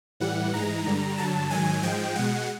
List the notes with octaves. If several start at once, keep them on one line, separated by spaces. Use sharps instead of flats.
A2 E3 G3 F#5
G#2 E3 G#3 A#5
G2 D3 G3
G2 D3 F#3 A5
G#2 D#3 F#3 G#5
G#2 F3 G#3 G5
B2 G#3 F#5